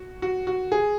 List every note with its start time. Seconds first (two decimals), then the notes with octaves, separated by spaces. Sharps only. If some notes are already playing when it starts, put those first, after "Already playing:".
Already playing: F#4
0.22 F#4
0.47 F#4
0.72 G#4